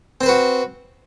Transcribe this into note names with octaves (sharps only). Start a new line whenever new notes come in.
C4 F#4 B4 C5